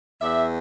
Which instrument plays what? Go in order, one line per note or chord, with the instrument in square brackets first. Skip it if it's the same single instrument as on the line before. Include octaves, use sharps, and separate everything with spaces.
[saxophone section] E2 D5 E5